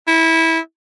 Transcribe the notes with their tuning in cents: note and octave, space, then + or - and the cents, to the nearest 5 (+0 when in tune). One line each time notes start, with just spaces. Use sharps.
E4 -15